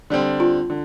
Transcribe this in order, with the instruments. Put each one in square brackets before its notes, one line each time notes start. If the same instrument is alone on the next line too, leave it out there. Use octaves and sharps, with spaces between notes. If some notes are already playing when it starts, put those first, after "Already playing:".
[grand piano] D3 G3 C4
[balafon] F4
[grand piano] D3